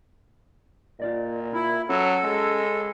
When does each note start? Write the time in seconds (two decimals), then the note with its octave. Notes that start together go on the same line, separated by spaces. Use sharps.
1.00 A#2 F4 D5 D#5
1.53 E4 F4
1.89 F#3 C#4 A4
2.24 G#3